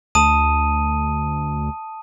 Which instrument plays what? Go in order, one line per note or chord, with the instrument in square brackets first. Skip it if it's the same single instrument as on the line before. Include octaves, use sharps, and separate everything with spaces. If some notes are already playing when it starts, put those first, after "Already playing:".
[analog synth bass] D2 [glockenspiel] A5 D#6 D#7